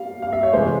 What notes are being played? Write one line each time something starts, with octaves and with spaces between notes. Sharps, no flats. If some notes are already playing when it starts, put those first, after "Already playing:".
Already playing: G3 F5
F5
E5
C#5
C3 E3 G#3 C5